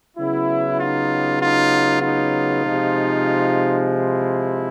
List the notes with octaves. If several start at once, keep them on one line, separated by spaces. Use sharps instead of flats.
C#3 F#3 B3 E4
D#4 F4
D#4 F4
D#4 F4
C3 F3 G#3
E4